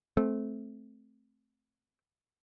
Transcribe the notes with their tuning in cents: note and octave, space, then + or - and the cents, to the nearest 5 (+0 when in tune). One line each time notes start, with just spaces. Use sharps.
A3 -15 C4 +0